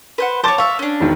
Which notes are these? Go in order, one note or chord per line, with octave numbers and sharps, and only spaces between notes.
B4 C5 F#5
C5 C#5 A5 D6 A6
E5 F5 C#6
C#4 D4
E1 D#3